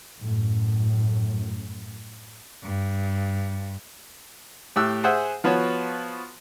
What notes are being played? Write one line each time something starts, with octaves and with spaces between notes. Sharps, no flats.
F#2 A2
G2
A2 G4 E6 F#6
G#4 C5 E5 F#5 G#5
F3 B3 F#4 C#5